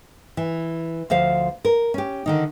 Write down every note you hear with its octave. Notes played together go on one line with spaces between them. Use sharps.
E3
D2 F3 C5 F5
A#4
C#4 G4
D3 D#3 D#4